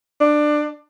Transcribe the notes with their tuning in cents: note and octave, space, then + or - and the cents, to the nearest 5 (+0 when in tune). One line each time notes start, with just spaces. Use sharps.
D4 +20